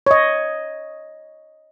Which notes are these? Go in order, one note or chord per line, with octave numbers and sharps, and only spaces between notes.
C#5 D#5